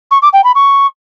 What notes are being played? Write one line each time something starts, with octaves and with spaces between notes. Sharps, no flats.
C#6
D6
G5
B5
C#6